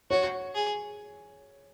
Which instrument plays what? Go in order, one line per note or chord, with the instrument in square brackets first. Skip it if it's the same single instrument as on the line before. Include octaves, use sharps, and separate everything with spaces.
[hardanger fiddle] F#4 [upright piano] C#5
[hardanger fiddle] G#4